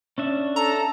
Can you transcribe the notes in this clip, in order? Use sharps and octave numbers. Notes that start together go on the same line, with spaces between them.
C#4 D4 E5
A4 A#5